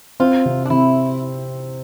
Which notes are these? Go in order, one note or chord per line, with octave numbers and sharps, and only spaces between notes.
C4 F4
C3
D4
C3 E4